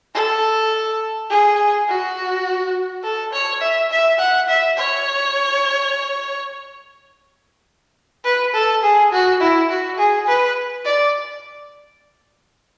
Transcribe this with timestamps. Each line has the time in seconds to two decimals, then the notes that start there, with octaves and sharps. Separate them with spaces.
0.15 A4
1.30 G#4
1.89 F#4
3.03 A4
3.33 C#5
3.61 E5
3.91 E5
4.19 F#5
4.49 E5
4.78 C#5
8.25 B4
8.54 A4
8.83 G#4
9.12 F#4
9.41 E4
9.69 F#4
9.98 G#4
10.27 B4
10.86 D5